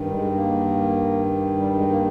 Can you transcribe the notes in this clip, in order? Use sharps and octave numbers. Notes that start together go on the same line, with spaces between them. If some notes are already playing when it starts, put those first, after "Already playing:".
Already playing: G2 D#3
G3
G#3
A#3
G3
G#3
A#3